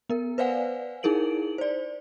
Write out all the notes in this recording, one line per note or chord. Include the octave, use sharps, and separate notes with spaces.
B3 A#4
B4 C5 D5 F5 F#5 G#5
D#4 E4 G#4 A#4 D7 F#7
C5 D5